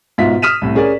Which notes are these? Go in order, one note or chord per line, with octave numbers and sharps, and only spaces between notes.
G#2 B2 F4 E5 F5 B6
D#6 F6 B6 D#7 E7
C2 A2
C#4 G#4 A#4 D5